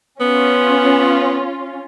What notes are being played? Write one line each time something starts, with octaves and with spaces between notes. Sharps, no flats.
B3 C#4 F4